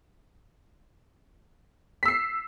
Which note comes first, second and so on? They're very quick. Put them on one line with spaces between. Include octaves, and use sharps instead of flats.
B6 E6 C7